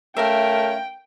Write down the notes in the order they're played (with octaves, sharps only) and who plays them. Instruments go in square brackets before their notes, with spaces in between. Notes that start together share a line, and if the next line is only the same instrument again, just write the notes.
[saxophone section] A3 C#4 A#4 [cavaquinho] E5 F5 [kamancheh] G5